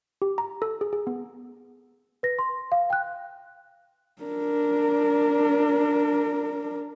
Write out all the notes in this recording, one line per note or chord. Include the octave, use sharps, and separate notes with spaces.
G4
A#5
A4
G#4
G#4
B3
B4 A#6
C6
F5
G5 F#6
D4 A#4